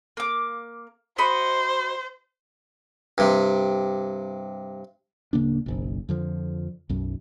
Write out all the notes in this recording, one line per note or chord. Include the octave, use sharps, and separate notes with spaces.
A#3 D6
F#4 C5 D#5 B5
G2 C3
D1 C#3 A#3 D4
F#1 B1
F2 D3 F3
B1 F#2